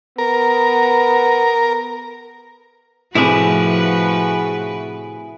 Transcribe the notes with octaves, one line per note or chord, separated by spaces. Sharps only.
B3 A#4
A2 C3 F3 E4 F#4 G#4 B4